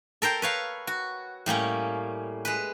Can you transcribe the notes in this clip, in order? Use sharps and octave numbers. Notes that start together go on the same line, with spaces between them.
A4 A#4 C5 G5
B4 C#5 F5
F#4
A2 G3 A#3 C#4
G#3 B4